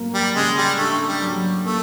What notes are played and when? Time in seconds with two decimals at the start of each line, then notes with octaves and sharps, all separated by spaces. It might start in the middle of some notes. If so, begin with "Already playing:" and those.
Already playing: F#3 A#3
0.14 G3
0.35 C#3 G#3
0.58 G3
0.78 A3 D4
1.08 G3
1.21 F#3
1.65 A3 A#3